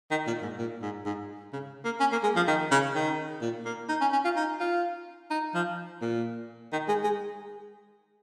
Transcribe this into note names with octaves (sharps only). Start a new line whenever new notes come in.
D#3
A#2
G#2
A#2
G#2
G#2
C#3
A#3
C#4
A#3
G#3
F3
D#3
C#3
D#3
A#2
A#3
D#4
C#4
C#4
F4
D#4
F4
D#4
F3
A#2
D#3
G#3
G#3